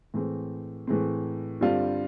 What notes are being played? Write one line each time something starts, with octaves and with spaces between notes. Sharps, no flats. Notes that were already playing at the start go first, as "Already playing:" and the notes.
A2 E3 G#3 C4
A2 E3 G#3 C4
G2 D3 G3 C4 F4